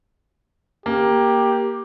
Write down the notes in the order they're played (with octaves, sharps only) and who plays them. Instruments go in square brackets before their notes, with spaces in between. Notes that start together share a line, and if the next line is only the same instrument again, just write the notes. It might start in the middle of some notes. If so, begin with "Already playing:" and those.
[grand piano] A#3 [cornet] G4